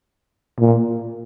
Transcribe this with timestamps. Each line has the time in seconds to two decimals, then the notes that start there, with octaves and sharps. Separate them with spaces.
0.59 A#2